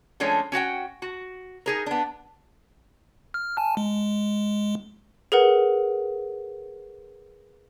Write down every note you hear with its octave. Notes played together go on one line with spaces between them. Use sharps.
F3 G#3 A3 C#4 D4
C#4 F#4 F#5 G5
F#4
D#4 G#4 A#4
B3 D4
F6
G#5 A5
G#3
G#4 A#4 B4 F#5